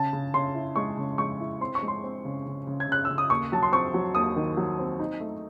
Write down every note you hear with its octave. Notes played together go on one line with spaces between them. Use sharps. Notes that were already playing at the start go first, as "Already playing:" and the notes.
Already playing: C#3 A5
C#3
C#3 C6
E4
G#3 C#6
C#3
G#3 C#6
E4
C4 C6
C#6
G#3
C6
C4
C#3
C#3
C#3
G#6
C#3 F#6
C#3 E6
D#6
D#2 C#6
F#3 A5
C6
C4 C#6
F#3
D#2 D#6
D#3
F#3
C4
D#4
A3